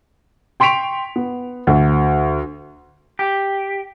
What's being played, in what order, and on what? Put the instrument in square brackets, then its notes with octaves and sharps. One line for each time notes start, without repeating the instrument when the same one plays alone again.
[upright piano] G5 C6 C#6 B6 D7 F7
B3
D2
[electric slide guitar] G4